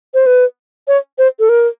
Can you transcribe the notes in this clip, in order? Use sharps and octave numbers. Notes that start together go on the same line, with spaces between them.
C5
B4
C#5
C5
A4
A#4